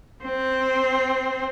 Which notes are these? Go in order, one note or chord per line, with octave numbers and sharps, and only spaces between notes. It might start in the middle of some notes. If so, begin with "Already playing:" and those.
C4